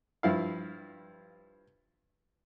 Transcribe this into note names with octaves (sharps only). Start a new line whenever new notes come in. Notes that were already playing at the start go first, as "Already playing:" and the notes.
G2 F3 E4 F5